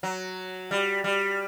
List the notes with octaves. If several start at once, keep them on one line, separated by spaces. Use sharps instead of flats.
F#3
G3
G3